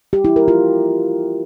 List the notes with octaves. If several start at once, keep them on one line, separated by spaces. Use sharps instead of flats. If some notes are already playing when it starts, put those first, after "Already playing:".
G4
E4
A#4
F4